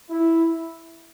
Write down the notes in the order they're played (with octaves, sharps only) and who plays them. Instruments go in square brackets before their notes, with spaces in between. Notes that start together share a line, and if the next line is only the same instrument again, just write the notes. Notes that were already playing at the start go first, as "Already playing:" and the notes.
[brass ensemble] E4